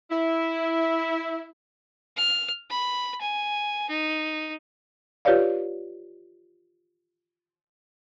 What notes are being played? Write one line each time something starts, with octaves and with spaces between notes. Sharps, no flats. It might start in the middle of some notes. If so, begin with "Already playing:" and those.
E4
F6
B5
G#5
D#4
F4 G4 B4 C#5 D5 F5